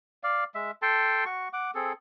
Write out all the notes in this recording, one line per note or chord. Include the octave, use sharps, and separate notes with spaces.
D5 F5
G#3 E5
A4 G5 A5 C6
F#4 C#6
F#5 D6
C4 G#4 A4